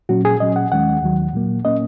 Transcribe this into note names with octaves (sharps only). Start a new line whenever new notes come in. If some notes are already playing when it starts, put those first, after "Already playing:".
A#2 F#3 C#4 F#4
G#4
A#2 F#3 C#4 D#5
F#5
D#2 D#3 G#3 C#4 F#5
D#2 D#3 F#3
A#2 F#3 A#3
A#2 A#3 C#4 D#5